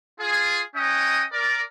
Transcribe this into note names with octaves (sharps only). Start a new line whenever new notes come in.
F4 G#4
C#4 D#5 F#5 G5 D#6
A#4 D5